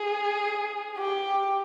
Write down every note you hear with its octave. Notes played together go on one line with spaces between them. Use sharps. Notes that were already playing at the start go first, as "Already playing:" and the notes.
Already playing: G#4
G4